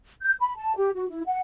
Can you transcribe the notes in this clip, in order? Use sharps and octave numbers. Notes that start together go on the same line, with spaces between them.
G6
B5
A5
G4
F#4
E4
F#5